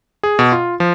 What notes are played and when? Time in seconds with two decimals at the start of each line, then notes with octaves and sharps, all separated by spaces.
0.23 G#4
0.39 B2
0.52 F4
0.80 F3